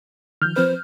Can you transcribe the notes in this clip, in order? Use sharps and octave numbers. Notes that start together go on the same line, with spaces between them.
D#3 F3 F6 G6
F3 C4 B4 C5